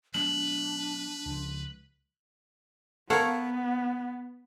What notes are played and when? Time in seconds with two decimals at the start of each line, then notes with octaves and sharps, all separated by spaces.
0.14 F#3 A3 B3 D4 B4 F#7
1.26 C#2 F3
3.10 B3 A4 A#4 C#5 F5 F#5